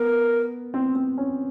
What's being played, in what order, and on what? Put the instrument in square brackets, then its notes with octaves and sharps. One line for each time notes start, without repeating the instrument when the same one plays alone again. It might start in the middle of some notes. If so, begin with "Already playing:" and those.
Already playing: [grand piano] B3 [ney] A#4
[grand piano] C4
C4
C#4